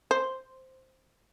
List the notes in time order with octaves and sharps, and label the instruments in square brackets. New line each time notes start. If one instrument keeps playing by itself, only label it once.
[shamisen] C5